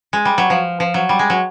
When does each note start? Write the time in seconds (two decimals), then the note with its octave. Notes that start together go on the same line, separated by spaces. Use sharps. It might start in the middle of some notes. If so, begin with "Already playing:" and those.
0.13 G#3
0.25 G3
0.38 F#3
0.50 F3
0.80 F3
0.94 F#3
1.09 G3
1.19 G#3
1.30 F#3